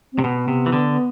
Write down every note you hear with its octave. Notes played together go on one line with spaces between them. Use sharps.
C4
C3
B2 B3
C3
E3
D3